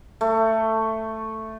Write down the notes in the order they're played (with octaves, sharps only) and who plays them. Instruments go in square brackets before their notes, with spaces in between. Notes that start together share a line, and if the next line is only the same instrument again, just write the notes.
[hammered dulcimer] A3